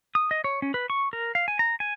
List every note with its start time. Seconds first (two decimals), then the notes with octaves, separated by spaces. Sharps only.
0.15 D#6
0.31 D#5
0.44 C#5
0.62 C#4
0.74 B4
0.90 C#6
1.13 A#4
1.35 F5
1.48 G#5
1.59 A#5
1.80 G#5